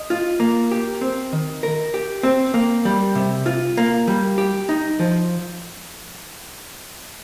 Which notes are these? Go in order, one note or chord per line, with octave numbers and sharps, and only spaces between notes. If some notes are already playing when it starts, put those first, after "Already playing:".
Already playing: D#5
F4
A#3
G4
C4
D#3
A#4
G4
C4
A#3
G3
C3
F4
A#3
G3
G4
D#4
F3